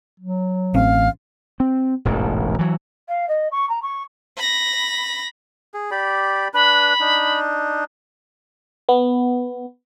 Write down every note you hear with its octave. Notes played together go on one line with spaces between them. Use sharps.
F#3
A1 C4 F5
C4
E1 A1 G#2
E3 F#3
F5
D#5
C#6
A#5
C#6
B5 A#6
G#4
G4 D5 B5
D4 B4 B5
D4 D#4
B3